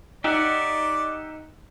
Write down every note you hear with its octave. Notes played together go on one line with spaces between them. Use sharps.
D#4 G4 D5 E5 F#5